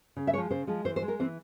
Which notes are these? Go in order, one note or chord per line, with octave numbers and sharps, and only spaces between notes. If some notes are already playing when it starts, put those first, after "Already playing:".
C#3
E5
F3 G#3 C#5
C#3 C5
F3 G#3
E3 C5
C5
G#3
A#4
E3 C4